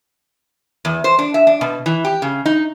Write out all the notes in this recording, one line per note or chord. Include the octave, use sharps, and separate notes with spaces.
E2
C5
D4
E5
D4
B2
E3
G4
C#3
D#4